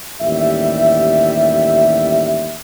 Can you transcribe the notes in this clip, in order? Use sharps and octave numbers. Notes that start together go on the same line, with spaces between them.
A1 D#2 G3 E5